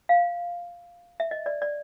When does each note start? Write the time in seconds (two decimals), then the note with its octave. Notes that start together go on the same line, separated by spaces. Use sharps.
0.09 F5
1.20 E5
1.31 D#5
1.46 D5
1.62 D5